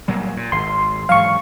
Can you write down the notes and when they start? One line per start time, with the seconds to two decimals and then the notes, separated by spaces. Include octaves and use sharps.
0.08 A#2 F#3 G3
0.37 A#2
0.52 G#1 C6
1.09 G#2 E3 F#3 F5 C#6